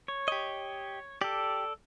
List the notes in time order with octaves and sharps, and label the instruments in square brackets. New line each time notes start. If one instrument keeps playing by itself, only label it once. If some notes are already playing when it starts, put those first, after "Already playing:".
[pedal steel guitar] C#5
[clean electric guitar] G4 D#5
[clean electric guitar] G4 [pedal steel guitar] A4 D5